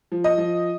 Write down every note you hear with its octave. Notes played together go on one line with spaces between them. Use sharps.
F3
D#5
F3